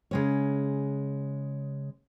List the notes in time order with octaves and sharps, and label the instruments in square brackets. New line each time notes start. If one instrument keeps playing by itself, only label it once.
[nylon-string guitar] C#3 G#3 C#5